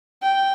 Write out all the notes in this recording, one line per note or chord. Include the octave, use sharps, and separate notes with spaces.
G5